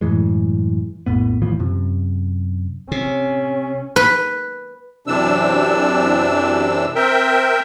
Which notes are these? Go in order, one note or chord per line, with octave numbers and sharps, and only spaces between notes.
F#2 A2 E3 G#3
A#1 F2 A2 B3
D#2 A2 E3 F3
F#2 C3
C3 C#4
B4
F#2 C3 E3 D4 E6
C4 A#4 E5 G5